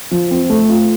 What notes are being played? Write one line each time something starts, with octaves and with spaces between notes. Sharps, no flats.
F3
C4
A3
F4